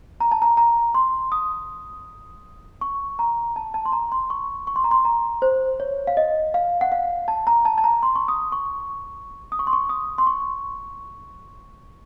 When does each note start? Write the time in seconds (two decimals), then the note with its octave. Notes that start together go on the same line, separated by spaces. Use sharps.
0.20 A#5
0.32 A5
0.42 A#5
0.57 A#5
0.95 C6
1.32 D#6
2.81 C#6
3.19 A#5
3.56 A5
3.74 A5
3.86 C6
3.92 A#5
4.12 C6
4.30 C#6
4.67 C#6
4.76 C6
4.84 A#5
4.91 C6
5.05 A#5
5.42 C5
5.80 C#5
6.07 F5
6.17 D#5
6.54 F5
6.81 F#5
6.92 F5
7.28 A5
7.47 A#5
7.65 A5
7.78 A5
7.84 A#5
8.03 C6
8.16 C#6
8.28 D#6
8.52 C#6
9.52 D#6
9.59 C#6
9.67 C6
9.73 C#6
9.89 D#6
10.18 C6
10.27 C#6